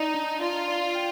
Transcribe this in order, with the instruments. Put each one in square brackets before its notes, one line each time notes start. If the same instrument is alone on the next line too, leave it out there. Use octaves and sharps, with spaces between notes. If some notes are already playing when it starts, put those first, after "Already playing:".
Already playing: [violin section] D#4 [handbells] D5
[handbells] D4
[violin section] F4 [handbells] D5
[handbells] D5
G5